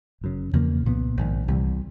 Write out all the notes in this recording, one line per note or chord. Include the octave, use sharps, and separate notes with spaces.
G1 F#2 C#3
E2 C#3 F3 A#3
C2 A#2 F#3 B3
A#1 G#2 D#3
C2 C3 E3 G3